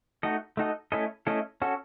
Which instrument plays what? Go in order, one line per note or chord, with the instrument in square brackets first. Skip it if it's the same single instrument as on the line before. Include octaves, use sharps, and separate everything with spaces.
[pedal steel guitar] A3 D#4 F#4 A4 D#5
A3 D#4 F#4 A4 D#5
A3 C#4 E4 A4 D#5
A3 C#4 E4 A4 D#5
C#4 F#4 A4